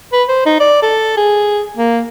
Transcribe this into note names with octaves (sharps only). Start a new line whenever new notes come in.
B4
C5
D#4
D5
A4
G#4
A#3